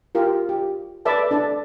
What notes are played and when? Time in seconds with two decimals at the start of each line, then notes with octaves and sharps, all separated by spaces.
0.15 F4 G4 A#4
0.49 G4
1.05 A4 B4 D5 E5 A5
1.31 D4 A4 D5